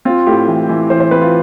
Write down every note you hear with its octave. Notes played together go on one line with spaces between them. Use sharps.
C4 F4
A2 G4
E3
E3
E3 C5
C5
C4 B4
F4